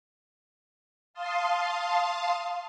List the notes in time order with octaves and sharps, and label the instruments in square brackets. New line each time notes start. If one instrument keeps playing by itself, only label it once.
[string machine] F5 A5 C6 D#6